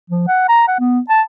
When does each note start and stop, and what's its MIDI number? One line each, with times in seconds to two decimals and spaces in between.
0.10 0.23 53
0.28 0.47 78
0.49 0.64 82
0.67 0.76 78
0.80 1.00 59
1.09 1.22 81